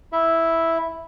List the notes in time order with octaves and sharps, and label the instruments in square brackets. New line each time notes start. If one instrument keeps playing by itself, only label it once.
[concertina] E4 E5